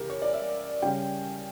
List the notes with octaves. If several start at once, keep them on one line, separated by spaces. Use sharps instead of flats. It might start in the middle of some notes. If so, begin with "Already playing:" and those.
Already playing: C#3 E3 G4 A#4
C#5
D5
E5
C#3 G3 C#4 G5